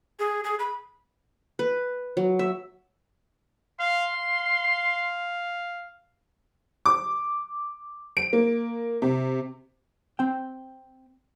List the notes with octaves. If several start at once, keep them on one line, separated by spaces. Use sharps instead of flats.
G#4
G#4
B5
B4
F#3
E5
F5 C6
F5
D6
D7
A#3
C3
C4 G5